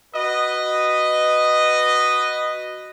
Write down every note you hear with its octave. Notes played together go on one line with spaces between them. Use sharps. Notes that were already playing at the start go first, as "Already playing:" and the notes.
F#4 B4 D#5